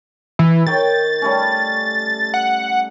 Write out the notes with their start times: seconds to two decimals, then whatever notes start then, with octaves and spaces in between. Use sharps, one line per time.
0.39 E3
0.67 D#3 C#5 G5 A6
1.22 G3 A3 C#4
2.34 F#5